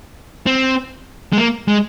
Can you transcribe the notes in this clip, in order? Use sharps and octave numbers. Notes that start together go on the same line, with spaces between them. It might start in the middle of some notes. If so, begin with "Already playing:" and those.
C4
G#3
A#3
G#3